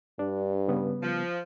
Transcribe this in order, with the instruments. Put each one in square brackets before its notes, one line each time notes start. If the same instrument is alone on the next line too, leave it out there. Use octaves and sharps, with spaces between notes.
[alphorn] G2 [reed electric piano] D4
[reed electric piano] C#3 G3 B3
[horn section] F3